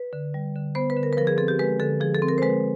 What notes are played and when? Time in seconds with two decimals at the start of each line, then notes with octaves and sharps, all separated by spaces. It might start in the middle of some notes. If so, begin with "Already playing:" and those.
Already playing: B4
0.13 D3
0.34 G3
0.55 D3
0.75 B3 C5
0.90 B4
0.96 D3
1.03 A#4
1.13 B4
1.17 F3 A#4
1.27 G#4
1.38 C4 A4
1.48 G4
1.59 G#3 B4
1.80 D3 A4
2.00 F3 G#4
2.15 A4
2.22 C4
2.28 A#4
2.38 C5
2.42 G#3 B4